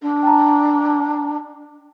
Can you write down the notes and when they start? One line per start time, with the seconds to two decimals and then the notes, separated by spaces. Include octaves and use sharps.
0.02 D4
0.23 G5 A5 A#5